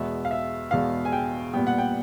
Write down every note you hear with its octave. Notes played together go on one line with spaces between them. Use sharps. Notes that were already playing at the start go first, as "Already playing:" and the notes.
Already playing: E2 B2 G#3 B3 E5
F5
E5
E2 B2 G#3 B3 F5
G#5
G5
A#2 G3 B3 G5
F#5
G5